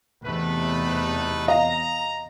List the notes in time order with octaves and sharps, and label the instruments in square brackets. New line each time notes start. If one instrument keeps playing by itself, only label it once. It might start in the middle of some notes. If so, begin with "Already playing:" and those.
[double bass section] E2 C3 [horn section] A3 D#4 B4
[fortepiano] D#5 F5 [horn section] A#5